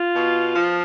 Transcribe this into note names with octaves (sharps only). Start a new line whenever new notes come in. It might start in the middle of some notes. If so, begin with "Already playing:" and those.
Already playing: F4
B2
F3